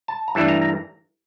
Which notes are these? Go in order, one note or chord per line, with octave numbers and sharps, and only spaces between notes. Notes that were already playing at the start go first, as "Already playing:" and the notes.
A5
A#5
G2 E3 A3 D4 A5
A#5
A#5